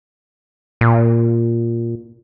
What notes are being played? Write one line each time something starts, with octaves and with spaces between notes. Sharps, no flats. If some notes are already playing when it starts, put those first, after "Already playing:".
A#2